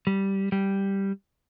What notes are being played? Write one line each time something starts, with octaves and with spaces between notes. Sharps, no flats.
G3
G3